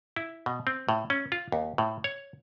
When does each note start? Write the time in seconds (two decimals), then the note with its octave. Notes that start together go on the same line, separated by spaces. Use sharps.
0.16 E4
0.46 B2
0.67 C4
0.89 A2
1.10 C#4
1.32 F4
1.52 D#2
1.78 A2
2.04 C#5